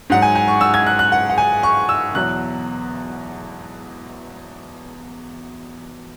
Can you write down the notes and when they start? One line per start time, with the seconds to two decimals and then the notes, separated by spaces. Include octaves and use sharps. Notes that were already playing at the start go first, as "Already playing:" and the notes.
0.10 G#2 F#3 F#5
0.22 G#5
0.35 G#5
0.48 C#6
0.61 E6
0.74 G#6
0.87 F#6
0.99 F#6
1.12 F#5
1.30 F#5
1.38 G#5
1.63 C#6
1.89 E6
2.14 E2 B2 F#3 F#6